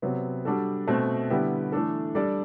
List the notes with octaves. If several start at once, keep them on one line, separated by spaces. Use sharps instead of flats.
C3 F#3 B3
G3 D4 F#4 A4
B2 A3 C4
D3 G3 B3 E4 G4
E3 A3 D4 A4
G3 D4 A4 D5